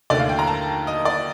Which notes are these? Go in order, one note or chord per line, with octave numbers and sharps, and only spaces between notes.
D#2 D3 A3 D5
F5
G5
A#5
A5
D#5
D5